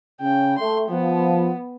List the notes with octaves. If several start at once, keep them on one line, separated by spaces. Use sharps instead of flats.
C#3 C#4 G5
A3 C6
F3 B3